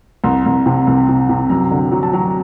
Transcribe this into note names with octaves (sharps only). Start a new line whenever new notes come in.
C2 C6
C2
C3
C2
C3
C3
F#2 A#5
D3
F#3
A5
F#3 A#5